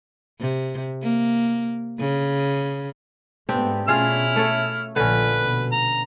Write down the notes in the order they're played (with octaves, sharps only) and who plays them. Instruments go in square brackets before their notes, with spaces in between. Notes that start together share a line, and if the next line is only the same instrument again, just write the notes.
[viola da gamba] C3
A#3
C#3
[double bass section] G#2 A3 B3 [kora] C4 D4 G4
[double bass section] B2 C#4 [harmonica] E4 F6 [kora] F4 G#4 F5
[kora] A3 A4 C#5
[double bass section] A#1 A#2 F3 [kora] D3 C#4 [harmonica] B4
[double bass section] B2
[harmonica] A#5